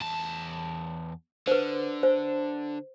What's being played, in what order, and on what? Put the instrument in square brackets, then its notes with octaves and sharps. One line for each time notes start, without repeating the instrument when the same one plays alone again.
[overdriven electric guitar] E2 A5
[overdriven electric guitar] D3 [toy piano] B4 C5
[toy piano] C5